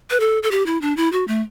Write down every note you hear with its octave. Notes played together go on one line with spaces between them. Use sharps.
B4
A4
A4
G4
E4
D4
E4
F#4
A3